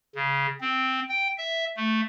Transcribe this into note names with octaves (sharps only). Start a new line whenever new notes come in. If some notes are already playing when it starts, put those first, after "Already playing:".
C#3
C4
G5
E5
A3